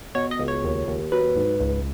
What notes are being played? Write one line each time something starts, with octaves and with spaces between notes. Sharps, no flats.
B2 C#5
D#5
C#2
C#5
D#2
D#2
F#3 B4
G#2
C#2